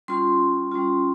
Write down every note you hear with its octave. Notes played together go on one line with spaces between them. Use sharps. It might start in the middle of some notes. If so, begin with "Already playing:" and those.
G3 C#4 F4 C6
G3 C#4 F4